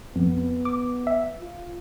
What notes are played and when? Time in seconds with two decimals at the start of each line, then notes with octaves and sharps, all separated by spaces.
0.16 F2 B3
0.65 D6
1.07 E5
1.40 F4